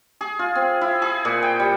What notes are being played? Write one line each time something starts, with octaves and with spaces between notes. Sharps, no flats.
G#4
F4
C4
E4
G#4
A#2
G5
G3